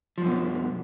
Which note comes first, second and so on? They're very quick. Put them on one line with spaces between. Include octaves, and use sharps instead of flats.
F3 F#2 B2